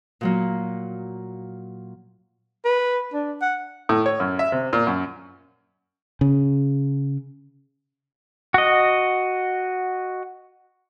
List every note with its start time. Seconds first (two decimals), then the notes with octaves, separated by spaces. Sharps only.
0.21 A#2 F#3 A#3
2.65 B4
3.13 D4
3.41 F#5
3.89 A2
4.06 C#5
4.20 F#2
4.39 E5
4.52 C3
4.73 A#2
4.87 F#2
6.21 C#3
8.54 F#4 D#5